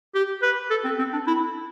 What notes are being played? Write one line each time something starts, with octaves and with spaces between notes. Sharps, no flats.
G4
B4
A4
C4
C4
D4
E4